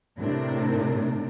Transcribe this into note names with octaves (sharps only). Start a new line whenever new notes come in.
A2 C3 A3 D4 A#4